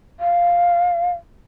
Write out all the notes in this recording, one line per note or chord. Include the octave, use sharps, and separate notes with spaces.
F5